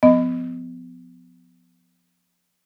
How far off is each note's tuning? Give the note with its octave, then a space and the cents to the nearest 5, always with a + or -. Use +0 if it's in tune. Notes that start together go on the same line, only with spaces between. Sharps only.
F3 +20 B3 +30 D#5 +0